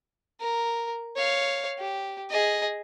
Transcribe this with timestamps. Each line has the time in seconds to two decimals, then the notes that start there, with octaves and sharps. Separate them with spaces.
0.40 A#4
1.16 C#5 F5
1.78 G4
2.30 G#4 D#5